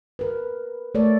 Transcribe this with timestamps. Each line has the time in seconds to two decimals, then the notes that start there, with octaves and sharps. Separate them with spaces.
0.19 A#4 B4
0.95 A3 A4 A#4 C#5 D5